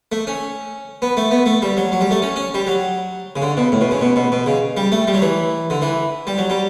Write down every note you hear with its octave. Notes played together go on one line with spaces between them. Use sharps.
A3
C#4
B3
A3
B3
A3
G3
F#3
F#3
G3
A3
C#4
C#4
G3
F#3
C#3
D3
B2
A2
B2
C#3
B2
B2
B2
C#3
G3
A3
G3
F#3
E3
D3
E3
G3
F#3
G3